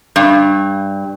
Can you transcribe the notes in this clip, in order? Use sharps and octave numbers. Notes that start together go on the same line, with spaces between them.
G2